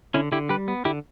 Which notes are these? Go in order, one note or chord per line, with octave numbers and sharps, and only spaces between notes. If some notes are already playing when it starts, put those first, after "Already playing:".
D3 C#4 E4
D3 E4 G4
G3 G4 B4
B3
D3 E4 G4